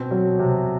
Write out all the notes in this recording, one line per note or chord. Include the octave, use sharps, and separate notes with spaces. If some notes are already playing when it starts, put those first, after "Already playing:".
Already playing: B2 C4
F#3
C3